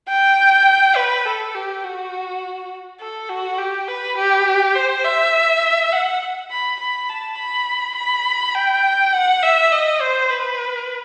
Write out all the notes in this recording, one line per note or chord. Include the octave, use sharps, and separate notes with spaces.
G5
B4
A4
G4
F#4
A4
F#4
G4
B4
G4
C5
E5
F#5
B5
B5
A5
B5
B5
G5
F#5
E5
D#5
C5
B4